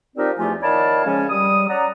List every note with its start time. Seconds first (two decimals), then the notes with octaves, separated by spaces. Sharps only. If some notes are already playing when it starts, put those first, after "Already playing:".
0.16 F3 C4 D#4 G4 A#4 D5
0.38 E2 F3 A3 F4 G4 G#5
0.62 D#3 C#5 D5 F5 A5 B5
1.05 C#3 F3 G#3 C#4
1.30 G3 D#6
1.69 C#4 D5 F#5 A#5